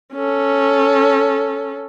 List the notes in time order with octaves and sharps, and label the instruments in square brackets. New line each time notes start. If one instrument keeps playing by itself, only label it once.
[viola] C#4 A4